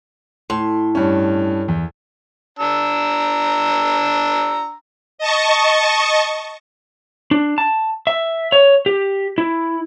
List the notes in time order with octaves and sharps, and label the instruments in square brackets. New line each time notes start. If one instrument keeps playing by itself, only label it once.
[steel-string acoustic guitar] A2 [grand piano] C6
[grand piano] G2 C#4
E2
[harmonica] D4 A#5 E6
[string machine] D#5 A5 C#6
[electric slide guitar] D4
A5
E5
C#5
G4
E4